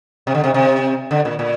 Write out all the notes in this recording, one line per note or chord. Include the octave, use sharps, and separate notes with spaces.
C3
D3
C3
C3
D3
A#2
A#2